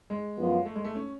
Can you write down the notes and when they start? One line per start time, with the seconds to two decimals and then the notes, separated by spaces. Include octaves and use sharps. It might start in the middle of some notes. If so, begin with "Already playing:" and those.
0.10 G#3
0.37 F#2 F3 B3 F4
0.66 A3
0.76 G#3
0.84 A3
0.95 C#4